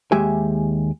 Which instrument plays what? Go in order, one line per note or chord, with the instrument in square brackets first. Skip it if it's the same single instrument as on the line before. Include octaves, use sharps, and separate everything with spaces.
[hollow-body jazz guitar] D#2 G#3 G4 E5 G#5